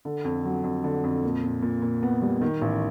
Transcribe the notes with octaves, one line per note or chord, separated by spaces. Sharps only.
D3
F2
F#3
F2
D3
F2
A#2
A#2
A#2
A#2
B3
G3
D#3
A1